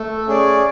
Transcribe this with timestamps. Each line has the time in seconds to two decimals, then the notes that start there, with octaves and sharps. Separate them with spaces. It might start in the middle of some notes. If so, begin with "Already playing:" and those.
Already playing: A3
0.27 C#4 G#4 D5